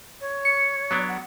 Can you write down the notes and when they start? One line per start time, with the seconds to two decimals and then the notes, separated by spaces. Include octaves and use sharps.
0.21 C#5
0.45 C#7
0.91 F#3 B3 D4
1.08 F#5